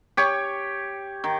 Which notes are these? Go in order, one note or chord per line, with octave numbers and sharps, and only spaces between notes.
G4 C#5
D#3